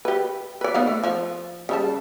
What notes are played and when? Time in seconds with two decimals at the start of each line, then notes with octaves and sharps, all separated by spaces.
0.05 G4 B4
0.61 B4 D5
0.74 B3 D#4 F5
0.87 A3
1.03 F3
1.69 C#3 G3 A5